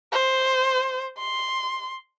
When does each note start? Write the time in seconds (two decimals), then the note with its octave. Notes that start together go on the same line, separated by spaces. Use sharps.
0.12 C5
1.18 C6